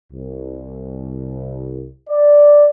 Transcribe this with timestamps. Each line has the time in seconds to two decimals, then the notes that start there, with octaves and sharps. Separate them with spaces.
0.12 C2
2.09 D5